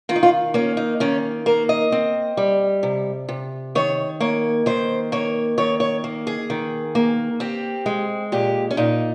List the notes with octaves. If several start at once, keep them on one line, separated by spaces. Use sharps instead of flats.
D#3 F4
D#4
F4
A#3 C#4
D#4
D#3 C#4
A#3 A#4
D#5
C4
G3
C3
C3
D#3 C#5
A#3 C#5
D#3 C5
A#3 C#5
D#3 C#5
C#5
A#3
G#4
D#3
A#3
C4 G4
G#3
A#2 G4
C#4
A#2 D#4